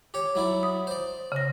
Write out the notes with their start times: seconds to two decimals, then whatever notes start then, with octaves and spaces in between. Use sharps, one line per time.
0.14 G4 C#5 D6
0.35 F#3 E4 D5
0.63 D#6
0.87 C5 D5
1.32 C#3 A#6